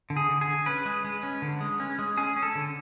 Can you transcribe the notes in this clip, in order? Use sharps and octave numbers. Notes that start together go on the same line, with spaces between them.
D3
G#4
D3
G#4
D3
C#4 B4
G#3
G#3
C#4
D3
G#3
C#4
G#3
C#4 G#4
C#4
A4
D3